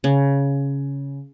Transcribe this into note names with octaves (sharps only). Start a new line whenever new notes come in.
C#3